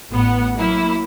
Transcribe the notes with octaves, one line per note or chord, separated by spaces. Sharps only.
A1 B3 F#5
F#3 A#3 E4